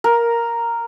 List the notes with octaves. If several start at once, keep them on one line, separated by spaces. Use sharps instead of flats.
A#4